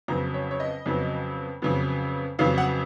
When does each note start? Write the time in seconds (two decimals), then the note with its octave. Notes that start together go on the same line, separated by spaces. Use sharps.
0.08 F2 C#3 F#3 B3 A#5
0.34 C#5
0.51 C#5
0.60 D#5
0.86 F2 C#3 F#3 B3
1.62 F2 C#3 F#3 B3
2.39 F2 C#3 F#3 B3 F5
2.58 F#5